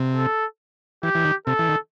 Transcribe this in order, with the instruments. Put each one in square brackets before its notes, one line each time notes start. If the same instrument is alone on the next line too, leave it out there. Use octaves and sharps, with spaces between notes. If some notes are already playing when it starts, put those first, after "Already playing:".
Already playing: [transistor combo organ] C3
[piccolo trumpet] A4
[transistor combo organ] E3 [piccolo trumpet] G4
[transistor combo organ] E3
D#3
[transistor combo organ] C3 [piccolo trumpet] A4
[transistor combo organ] E3
D#3